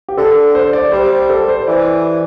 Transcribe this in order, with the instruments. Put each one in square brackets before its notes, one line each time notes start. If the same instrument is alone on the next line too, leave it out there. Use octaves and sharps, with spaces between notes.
[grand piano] G4
[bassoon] D3 [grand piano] A4
[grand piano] C5
D5
[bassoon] G3 [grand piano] C5
[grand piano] A4
C5
[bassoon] E3 [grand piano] D5